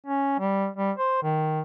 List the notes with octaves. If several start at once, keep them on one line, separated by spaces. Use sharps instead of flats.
C#4
G3
G3
C5
D#3